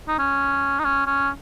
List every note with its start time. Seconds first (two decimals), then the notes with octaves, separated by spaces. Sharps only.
0.08 D#4
0.18 C#4
0.79 D#4
0.84 C#4
1.06 C#4